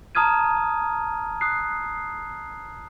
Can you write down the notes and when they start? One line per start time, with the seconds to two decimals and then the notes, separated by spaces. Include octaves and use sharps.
0.15 A5 A#5 D#6 F6 G#6 D#7
1.41 D#6 F#6 C7